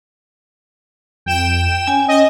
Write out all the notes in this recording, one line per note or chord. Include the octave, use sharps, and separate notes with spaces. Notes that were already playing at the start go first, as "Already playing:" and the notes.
F2 G5 E7
C#4 G#5
D#5